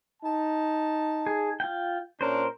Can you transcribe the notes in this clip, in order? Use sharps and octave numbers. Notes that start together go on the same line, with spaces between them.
D#4 A5
G#4
F4 G5
A#2 C#4 D4 A#4 C5